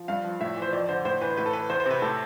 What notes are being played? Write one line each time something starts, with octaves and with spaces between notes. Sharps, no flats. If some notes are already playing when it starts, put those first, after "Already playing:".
Already playing: F3
G2 F5
F3
A2 E5
E3
C5
F2 D5
D3 C5
A2 C5
E3 B4
A2 B4
A4
E3 B4
E2 C5
C5
C3 B4
A2 A4